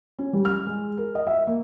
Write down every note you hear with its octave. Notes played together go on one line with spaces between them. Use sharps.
C#4
G3
F6
G#3
A#4
D#5
E5
A#3